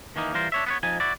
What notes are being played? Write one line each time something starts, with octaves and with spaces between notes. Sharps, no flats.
D#3 E3 A#3 D#4
E3 G3 F4 A#4 C5
D4 C#5 E5
B3 B4 C#5
F2 F3 D#4 G#5
E4 F#4 D5